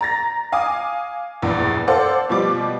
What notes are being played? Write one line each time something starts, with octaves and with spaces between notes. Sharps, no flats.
A#5 A6 A#6
F5 G#5 D6 D#6
A#1 E2 G2
A4 C5 D5 F5 F#5
B2 F3 G3 D6